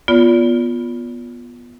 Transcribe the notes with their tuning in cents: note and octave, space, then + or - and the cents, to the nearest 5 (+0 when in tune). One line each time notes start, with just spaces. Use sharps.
B3 -15 F4 +0 D5 -40